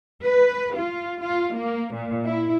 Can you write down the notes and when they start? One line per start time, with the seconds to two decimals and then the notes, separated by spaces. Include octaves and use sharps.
0.23 B4
0.76 F4
1.22 F4
1.55 A#3
1.95 A#2
2.27 E4